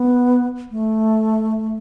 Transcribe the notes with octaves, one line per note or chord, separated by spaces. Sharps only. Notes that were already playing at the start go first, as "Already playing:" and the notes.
Already playing: B3
A3